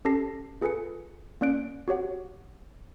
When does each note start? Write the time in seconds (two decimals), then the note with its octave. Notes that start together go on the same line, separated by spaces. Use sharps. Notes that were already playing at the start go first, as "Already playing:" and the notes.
0.05 C#4 G4 A4 A5 A#6 C7
0.61 F4 G#4 A4 B4 G#5 C#7
1.41 A#3 C#4 D5 F#6 D7
1.88 F#4 G4 C#5 F#5